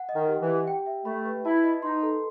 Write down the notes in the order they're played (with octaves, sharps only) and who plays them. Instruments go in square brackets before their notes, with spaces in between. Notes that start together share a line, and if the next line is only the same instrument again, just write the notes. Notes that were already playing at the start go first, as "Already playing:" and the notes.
Already playing: [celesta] F#5
D#5
[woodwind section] D#3
[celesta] G4
[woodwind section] E3
[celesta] G4
G5
E5
[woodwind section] A3 [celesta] B5
[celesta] B4
[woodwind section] E4 [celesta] A5
[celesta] D#5
[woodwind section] D#4 [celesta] C6
[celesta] A4